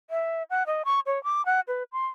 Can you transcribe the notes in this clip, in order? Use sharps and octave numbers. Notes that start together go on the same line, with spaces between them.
E5
F#5
D#5
C#6
C#5
D6
F#5
B4
C6